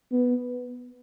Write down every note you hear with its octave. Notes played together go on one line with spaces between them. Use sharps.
B3